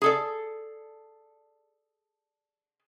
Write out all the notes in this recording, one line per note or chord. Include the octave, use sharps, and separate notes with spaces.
G#4 A4 D5